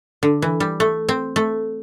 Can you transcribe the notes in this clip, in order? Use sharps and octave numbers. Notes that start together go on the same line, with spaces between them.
D3
E3
G3
A3
C4
A3